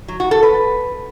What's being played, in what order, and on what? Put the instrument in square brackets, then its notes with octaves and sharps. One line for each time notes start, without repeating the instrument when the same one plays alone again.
[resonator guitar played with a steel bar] F#3
F#4
A4
B4